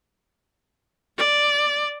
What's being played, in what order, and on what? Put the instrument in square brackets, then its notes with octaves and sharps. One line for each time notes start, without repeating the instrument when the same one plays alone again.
[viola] D5